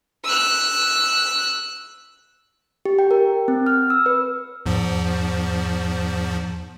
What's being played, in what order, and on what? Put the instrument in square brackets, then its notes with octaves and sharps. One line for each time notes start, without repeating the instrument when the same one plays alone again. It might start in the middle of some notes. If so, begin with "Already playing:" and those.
[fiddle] E6 F#6
[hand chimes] G4
G5
A#4
C4
F6
E6
B4
[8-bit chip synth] E2 G#2 F3